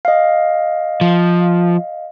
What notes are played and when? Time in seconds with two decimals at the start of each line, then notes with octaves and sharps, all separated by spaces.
0.05 D#5 F5
1.01 F3